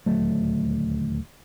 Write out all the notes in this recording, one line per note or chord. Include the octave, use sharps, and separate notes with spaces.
D#1 D2 F#3 A3